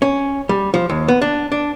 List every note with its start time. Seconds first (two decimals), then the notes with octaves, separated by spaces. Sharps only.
0.02 C#4
0.49 G3
0.74 F3
0.90 D#2
1.08 B3
1.22 D4
1.52 D4